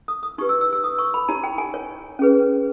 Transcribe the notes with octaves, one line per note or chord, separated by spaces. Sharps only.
D#6
D#6
D#4 G4 B4 C#6
E6
E6
E6
D#6
C#6
B5
D#4 G4 C#5 A#5
G5
G#5
C#5
C#4 G#4 B4